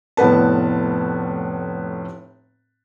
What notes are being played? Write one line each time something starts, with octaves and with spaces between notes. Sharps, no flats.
F1 A2 B3 B4 A5